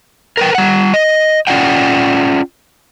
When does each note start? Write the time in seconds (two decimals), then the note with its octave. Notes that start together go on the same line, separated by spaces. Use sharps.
0.37 A#4 B4 G5
0.55 G3 F#5
0.94 D#5
1.47 C#4 F4 D5 F#5 G5